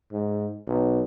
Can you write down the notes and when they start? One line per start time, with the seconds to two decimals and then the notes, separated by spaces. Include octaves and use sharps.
0.12 G#2
0.67 B1